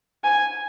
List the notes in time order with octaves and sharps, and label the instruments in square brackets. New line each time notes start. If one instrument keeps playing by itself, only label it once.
[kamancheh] G#5